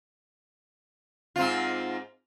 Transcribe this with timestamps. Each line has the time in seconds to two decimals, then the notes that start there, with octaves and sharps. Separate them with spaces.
1.36 G#2 C4 F4